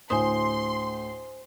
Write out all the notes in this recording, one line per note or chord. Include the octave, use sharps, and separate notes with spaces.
D2 A2 C5 G#5 C6 D#6